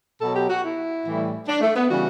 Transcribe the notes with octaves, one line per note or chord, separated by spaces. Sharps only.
B2 F#3 A4
G4
F#4
E4
A2 E3 G3
D4
A3
B3
C#3 E3 G3 F#4